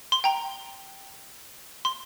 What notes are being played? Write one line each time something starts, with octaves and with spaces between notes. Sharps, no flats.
C6
G5 A#5
C6